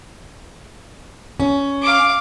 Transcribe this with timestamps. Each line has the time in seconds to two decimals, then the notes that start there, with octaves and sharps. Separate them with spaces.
1.40 C#4
1.81 F5 D6